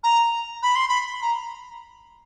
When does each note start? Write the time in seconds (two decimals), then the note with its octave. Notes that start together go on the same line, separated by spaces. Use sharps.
0.03 A#5
0.62 B5
0.75 C6
0.88 B5
1.22 A#5